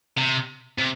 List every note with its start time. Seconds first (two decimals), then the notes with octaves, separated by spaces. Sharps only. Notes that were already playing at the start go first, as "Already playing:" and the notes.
0.17 C3
0.78 C3